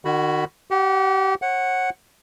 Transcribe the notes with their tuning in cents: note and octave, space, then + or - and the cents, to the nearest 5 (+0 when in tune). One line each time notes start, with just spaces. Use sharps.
D#3 -35 F#4 +0 B5 +0
G4 -30 F#5 +0
C#5 -40 F#5 +0